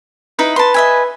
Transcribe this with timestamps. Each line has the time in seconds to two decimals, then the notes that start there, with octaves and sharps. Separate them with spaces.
0.39 D#4 E4 B4
0.56 B4 A5 C6
0.74 D#5 E5 G#5